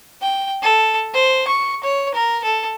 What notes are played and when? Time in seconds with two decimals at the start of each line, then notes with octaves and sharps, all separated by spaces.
0.22 G5
0.62 A4
1.14 C5
1.48 C#6
1.84 C#5
2.14 A#4
2.44 A4